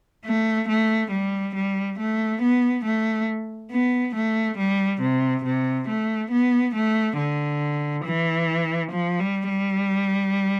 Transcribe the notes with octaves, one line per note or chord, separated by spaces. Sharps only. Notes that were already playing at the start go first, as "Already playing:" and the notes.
A3
A3
G3
G3
A3
B3
A3
B3
A3
G3
C3
C3
A3
B3
A3
D3
E3
F3
G3
G3